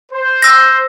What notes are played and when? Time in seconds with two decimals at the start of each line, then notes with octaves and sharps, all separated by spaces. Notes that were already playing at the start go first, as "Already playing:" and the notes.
0.12 C5
0.42 E6 A#6